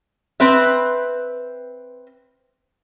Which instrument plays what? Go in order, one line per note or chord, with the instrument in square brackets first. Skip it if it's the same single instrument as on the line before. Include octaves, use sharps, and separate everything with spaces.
[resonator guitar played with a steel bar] C4 B4 E5